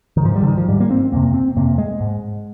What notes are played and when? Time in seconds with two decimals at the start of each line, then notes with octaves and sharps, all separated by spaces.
0.17 D#3
0.25 G#2 F3
0.36 G3
0.43 D3
0.47 D#3
0.57 F3
0.69 G#2 G3
0.80 A#3
0.91 C4
1.12 F2 C3 A#3
1.34 C4
1.56 F2 C3 A#3
1.78 G#3
2.00 G#2